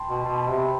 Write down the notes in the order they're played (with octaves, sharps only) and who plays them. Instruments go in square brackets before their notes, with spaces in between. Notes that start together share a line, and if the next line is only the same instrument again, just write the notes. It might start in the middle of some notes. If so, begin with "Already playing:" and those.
Already playing: [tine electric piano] G5 A5 B5 C6
[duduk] B2
[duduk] B2 [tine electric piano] A5 C6
[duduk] C3
[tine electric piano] G5 B5